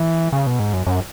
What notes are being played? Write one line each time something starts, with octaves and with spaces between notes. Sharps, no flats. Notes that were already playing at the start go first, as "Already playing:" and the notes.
Already playing: E3
C#3
B2
G#2
F#2
F#2